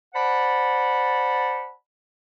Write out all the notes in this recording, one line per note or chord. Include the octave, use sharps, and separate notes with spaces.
C5 D5 F#5 A5 B5